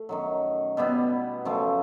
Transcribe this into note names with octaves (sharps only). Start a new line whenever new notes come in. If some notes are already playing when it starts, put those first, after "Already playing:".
Already playing: A3
F#2 D#3 F#3
B2 G3 B3 E4
F#2 C#3 F3 A3